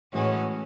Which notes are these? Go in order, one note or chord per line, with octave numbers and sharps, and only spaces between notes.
A2 E3 G#3 C#4 F#4